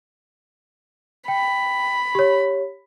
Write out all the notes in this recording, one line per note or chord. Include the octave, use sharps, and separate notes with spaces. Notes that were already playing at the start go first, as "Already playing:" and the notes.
G5 B5
G4 C#5